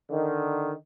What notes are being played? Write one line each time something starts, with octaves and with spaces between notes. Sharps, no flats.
D3 D#3